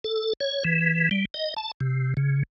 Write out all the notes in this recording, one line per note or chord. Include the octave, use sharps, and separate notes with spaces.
A4
C#5
E3
G3
D#5
A5
C3
C#3